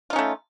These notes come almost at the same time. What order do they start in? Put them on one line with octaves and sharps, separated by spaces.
F4 D#4 C#4 A3